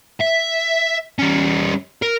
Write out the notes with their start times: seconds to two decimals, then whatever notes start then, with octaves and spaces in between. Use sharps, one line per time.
0.20 E5
1.19 G3 C#4
2.02 A#4